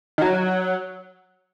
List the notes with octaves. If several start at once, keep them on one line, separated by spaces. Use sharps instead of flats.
D#3
F#3